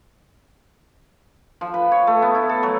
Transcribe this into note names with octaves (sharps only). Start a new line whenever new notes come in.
F3
B4
C#5
A3
B3
E4
A4
F#3